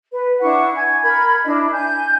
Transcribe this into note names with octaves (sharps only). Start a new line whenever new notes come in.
B4
D4 E4 F#5 C#6
G#5 G#6
A#4 B5 G#6
D4 E4 D#5
G#5 G6